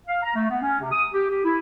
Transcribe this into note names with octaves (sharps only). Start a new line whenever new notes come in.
F5
A#5
A3
B3
C#4
C3
D#6
G4
G4
E4